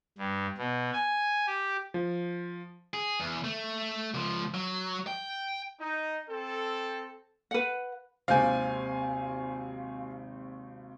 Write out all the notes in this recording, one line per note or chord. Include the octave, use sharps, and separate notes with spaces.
G2
B2
G#5
G4
F3
G#4
E2
A3
C#2 F3
F#3
G5
D#4
C4 A4
B4 F#5
G#1 D#2 C3 A4 C5 F5 G#5 G6